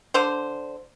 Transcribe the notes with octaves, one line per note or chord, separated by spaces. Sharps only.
D3 C5